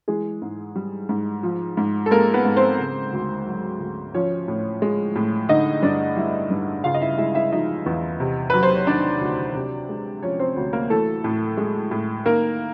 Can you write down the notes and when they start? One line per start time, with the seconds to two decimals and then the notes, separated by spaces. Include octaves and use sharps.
0.08 E3 G#3 G#4
0.42 G#2
0.76 G3
1.09 G#2
1.43 F3
1.77 G#2
2.06 A4
2.11 G#3 A#3 A#4
2.34 B3 B4
2.45 G#2
2.56 C4 C5
2.79 C#3
3.13 D2
3.46 F#3
3.80 D2
4.14 F3 C#4 C#5
4.48 A2
4.82 G#3
5.16 A2
5.49 D3 D#4 D#5
5.83 G2 D4 D5
6.16 G3 E4 E5
6.50 G2
6.84 C#3 F4 F5
6.94 D#5
7.01 E4 E5
7.18 G#3 E4 E5
7.35 E4 E5
7.52 F3 D#4 D#5
7.86 E2
8.20 C3
8.50 F#3 B4
8.63 C5
8.75 C#5
8.87 D#3 D4 D5
9.21 D2
9.55 C3
9.89 G#3
10.22 F3 C#4 C#5
10.39 C4 C5
10.56 D2
10.73 A#3 A#4
10.90 E3 A3 A4
11.24 A2
11.57 G#3
11.91 A2
12.25 D#3 A#3 A#4